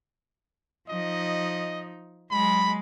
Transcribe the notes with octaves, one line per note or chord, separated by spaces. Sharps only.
F3 D#4 D#5
F#3 G#3 B5